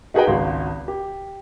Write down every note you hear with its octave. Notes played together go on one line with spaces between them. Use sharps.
D#4 F#4 G#4 B4 D#5 G5
G#1 C#2 F#4 C6
G4